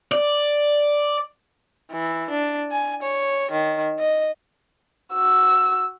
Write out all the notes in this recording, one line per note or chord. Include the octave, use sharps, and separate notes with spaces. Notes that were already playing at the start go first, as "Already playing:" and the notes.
D5
E3
D4
G#5
C#5
D#3
D#5
F#4 E6